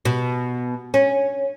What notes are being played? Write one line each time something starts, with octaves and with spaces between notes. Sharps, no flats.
B2
C#4